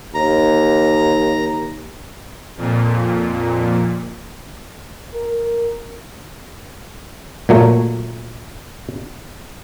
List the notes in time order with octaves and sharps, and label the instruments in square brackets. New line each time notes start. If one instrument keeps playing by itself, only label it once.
[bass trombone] D#2 [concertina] A#5
[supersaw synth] F2 A#2
[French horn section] A#4
[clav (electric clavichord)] A#2 F#3 A3